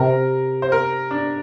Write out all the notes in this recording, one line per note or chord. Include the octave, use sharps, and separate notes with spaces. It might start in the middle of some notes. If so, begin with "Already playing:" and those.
Already playing: C3 A#4
C5
A#4
D4